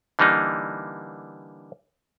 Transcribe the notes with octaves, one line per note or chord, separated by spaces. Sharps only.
D3 E3 G3 A#3 D#4